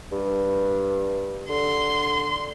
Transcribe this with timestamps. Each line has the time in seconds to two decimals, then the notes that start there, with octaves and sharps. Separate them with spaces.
0.12 G2
1.49 D3 C6